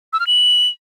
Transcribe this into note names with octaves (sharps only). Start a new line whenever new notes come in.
E6
F6
F#7